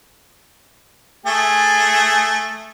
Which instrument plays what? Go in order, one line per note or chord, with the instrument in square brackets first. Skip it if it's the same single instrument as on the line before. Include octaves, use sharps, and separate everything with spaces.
[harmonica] A3 G#4